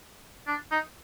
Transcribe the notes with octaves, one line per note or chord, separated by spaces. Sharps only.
D4
D#4